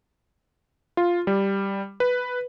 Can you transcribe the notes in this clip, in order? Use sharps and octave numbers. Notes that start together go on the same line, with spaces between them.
F4
G3
B4